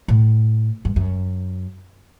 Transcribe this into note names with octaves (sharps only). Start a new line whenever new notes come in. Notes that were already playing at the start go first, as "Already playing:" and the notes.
A2
G2
F#2